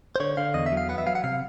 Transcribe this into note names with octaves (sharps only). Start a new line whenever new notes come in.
C5
D3 C#5
D3 F5
E2 D#5
E5
F#3
F5
B3 F#5
E5
F#3 F5
F#5
C3 F5